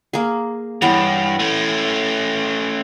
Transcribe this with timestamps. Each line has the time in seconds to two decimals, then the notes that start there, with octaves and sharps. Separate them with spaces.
0.13 A#3 G#4
0.82 G2 E3 B3 C#5
1.39 A3 C#4